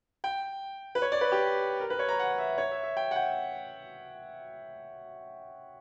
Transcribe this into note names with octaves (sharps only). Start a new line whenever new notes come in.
G5
B4
C#5
D5
B4
G4
A#4
B4
C#5
A#5
F#5
E5
C#5
E5
E5
G5
F#5
G5